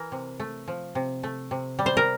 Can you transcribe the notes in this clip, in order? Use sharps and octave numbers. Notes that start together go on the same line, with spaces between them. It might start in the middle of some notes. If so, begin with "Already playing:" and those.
Already playing: E3 A#4
C3
A3
F3
C3
A3
C3
G3
C5
A#4